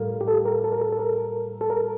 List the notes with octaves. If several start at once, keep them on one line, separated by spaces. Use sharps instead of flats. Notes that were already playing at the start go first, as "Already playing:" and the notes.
Already playing: A2 G3 A#3
G4
A4
A#4
A4
A#4
A4
A4
A#4
A4
A#4